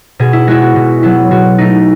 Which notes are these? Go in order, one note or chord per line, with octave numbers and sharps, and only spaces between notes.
B2 G#4
E4
G#3 B3 E4 F#4
F#4
B2
F#3 B3 E4
B2 F#4
A3 D#4